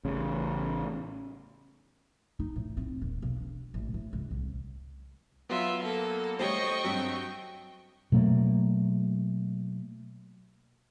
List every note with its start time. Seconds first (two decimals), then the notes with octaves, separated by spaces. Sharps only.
0.05 A1 C#3
2.40 D#4
2.56 A2
2.77 C4
3.02 D#1
3.22 B1
3.40 D4
3.74 A1
3.94 A2
4.13 C#2
4.31 C2
5.50 F#3 B3 F4 E5
5.84 A#3 A4
6.39 G3 A3 C5 C#5 D#5 G5 C#6
6.84 G2 F#3 C4 B6
8.12 B2 F#3 A3 A#3